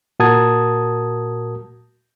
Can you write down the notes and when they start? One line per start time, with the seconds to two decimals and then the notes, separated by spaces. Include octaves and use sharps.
0.20 A#2 F#4 A#4 A5 D#6 G#6